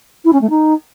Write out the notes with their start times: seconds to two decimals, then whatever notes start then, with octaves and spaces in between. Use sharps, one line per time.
0.24 E4
0.33 C#4
0.41 A3
0.50 D#4